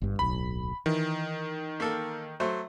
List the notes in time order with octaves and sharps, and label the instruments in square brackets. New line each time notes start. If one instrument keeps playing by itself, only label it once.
[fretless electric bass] G1 G2
[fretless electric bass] D1 B1 [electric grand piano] B5
[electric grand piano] D#3 [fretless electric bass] E3
[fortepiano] A#3 A4
F#3 A3 C5